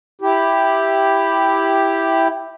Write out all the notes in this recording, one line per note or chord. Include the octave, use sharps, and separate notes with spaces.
E4 G4